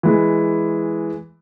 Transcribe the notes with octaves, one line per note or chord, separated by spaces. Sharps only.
E3 G#3